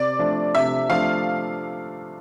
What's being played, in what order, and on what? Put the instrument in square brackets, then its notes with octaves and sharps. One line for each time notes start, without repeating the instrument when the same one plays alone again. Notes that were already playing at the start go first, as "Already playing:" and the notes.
Already playing: [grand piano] C3 [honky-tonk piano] D5
[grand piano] F3 A3 D4
[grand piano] C3 [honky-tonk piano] E5
[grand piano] F3 A3 D4 [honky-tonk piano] F5